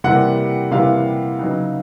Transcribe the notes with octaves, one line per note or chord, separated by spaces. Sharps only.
C3 E3 G3 A#3 F#5
C3 E3 G3 A#3 F5
C#3 F#3 B3 D#4